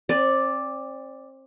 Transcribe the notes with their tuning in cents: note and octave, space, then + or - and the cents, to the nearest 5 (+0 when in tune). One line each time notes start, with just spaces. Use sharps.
C4 +35 D5 +0